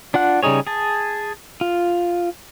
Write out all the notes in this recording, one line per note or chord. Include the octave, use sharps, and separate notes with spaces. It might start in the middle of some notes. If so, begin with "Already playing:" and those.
D4 F4 F#5 F#6
C#3 G3 D#4 G#4 C#5
G#4 A5
F4